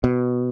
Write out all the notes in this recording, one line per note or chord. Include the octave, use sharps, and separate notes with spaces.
B2